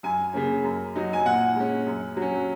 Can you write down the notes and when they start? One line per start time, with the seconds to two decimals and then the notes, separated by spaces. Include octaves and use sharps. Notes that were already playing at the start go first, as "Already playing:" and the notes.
0.03 F#2 G#5
0.33 C#3 A#3 C#4
0.64 F#2
0.96 F#3 D#4
1.13 G#5
1.25 A#2 F#5
1.56 G#3 C#4
1.86 F#2
2.17 F#3
2.22 C#4